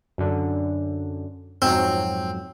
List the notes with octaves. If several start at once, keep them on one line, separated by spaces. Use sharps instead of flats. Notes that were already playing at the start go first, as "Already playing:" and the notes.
F#2 D3
F2 G#2 F#3 C4